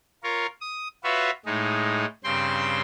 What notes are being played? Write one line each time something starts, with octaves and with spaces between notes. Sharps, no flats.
F4 A#4 C#5
D#6
F4 F#4 B4 C#5 E5
A2 G#3 D#4
G2 C#3 C4 G5 C6